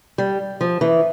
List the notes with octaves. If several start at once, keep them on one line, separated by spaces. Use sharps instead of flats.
G3
F3
E3